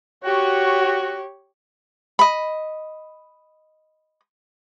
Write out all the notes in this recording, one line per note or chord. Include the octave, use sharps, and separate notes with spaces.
F#4 G4 C#5
D#5 B5